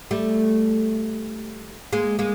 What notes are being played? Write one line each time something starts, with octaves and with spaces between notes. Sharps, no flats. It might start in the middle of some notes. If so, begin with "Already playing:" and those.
G3 A3
G#3 A#3
G#3 A#3